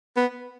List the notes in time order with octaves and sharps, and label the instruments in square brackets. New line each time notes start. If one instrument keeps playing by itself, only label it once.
[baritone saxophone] B3